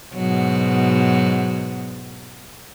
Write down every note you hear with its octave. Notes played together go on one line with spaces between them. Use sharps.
G#2 B2 F#3